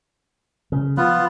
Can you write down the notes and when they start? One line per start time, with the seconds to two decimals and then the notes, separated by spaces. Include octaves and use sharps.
0.72 C#3
0.97 F3 B3 F4 B4